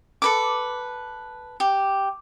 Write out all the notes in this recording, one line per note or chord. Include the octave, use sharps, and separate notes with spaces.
A4 B4 D6
G4